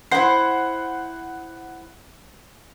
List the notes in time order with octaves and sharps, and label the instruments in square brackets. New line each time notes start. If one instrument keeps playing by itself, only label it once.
[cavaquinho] E4 C5 [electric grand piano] F#5 C7